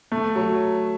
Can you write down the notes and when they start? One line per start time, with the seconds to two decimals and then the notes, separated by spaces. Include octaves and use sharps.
0.12 A3
0.36 F#3